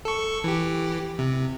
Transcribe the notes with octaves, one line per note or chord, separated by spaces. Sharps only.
A4 C#6
E3 G4
C3